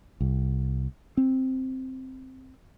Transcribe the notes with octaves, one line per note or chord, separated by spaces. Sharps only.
C2
C4